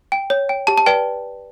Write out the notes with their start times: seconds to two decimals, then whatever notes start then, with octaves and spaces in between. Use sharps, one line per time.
0.12 G5
0.30 C#5
0.49 G5
0.67 G4 A5
0.78 A5
0.86 B4 D5 G5